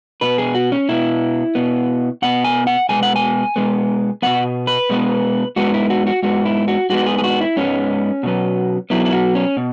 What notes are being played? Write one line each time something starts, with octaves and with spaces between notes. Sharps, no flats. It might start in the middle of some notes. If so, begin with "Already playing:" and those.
B2 B3 B4
G#4
F#4
C#4
B2 B3 E4
B2 B3
B2 B3 F#5
G#5
F#5
B2 G#3 B3 G#5
F#5
G#5
B2 G#3 B3
B2 G#3 B3 F#5
B4
B2 G#3 B3
G#2 G#3 B3 F#4
E4
F#4
F#4
G#2 G#3 B3 F#4
E4
F#4
G#2 G#3 B3 F#4
G#4
G#4
F#4
E4
G#2 G#3 B3 C#4
B2 F#3 B3
B2 F#3 B3 E4
E4
F#4
C#4
B2